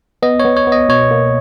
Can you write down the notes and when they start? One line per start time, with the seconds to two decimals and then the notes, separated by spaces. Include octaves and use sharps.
0.22 B3 D#5
0.40 C#5
0.45 B3
0.57 C#5
0.67 B3
0.72 D#5
0.89 B2 C#5
1.11 A#3